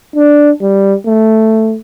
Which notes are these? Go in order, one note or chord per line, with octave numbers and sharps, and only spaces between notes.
D4
G3
A3